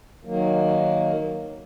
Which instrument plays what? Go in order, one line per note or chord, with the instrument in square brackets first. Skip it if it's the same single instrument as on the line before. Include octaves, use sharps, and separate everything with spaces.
[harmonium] D#3 F#3 A#3